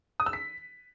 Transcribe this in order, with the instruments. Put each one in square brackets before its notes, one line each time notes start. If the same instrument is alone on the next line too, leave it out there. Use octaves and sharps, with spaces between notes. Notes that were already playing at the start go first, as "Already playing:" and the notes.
[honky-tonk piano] D#6
E6
B6